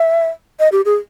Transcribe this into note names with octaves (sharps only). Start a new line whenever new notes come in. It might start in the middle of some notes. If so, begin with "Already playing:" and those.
Already playing: E5
D#5
G4
G#4